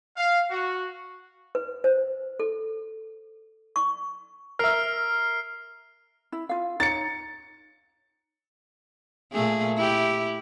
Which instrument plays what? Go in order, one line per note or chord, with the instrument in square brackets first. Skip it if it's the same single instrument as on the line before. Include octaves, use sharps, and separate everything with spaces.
[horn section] F5
F#4
[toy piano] B4
C5
A4
C#6
[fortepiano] A#4 E5 [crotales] F6 C7
[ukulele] E4
F4 F5
[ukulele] D#4 C#5 [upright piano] A6 C#7
[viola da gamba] A#2 A3 G#4
E4 G4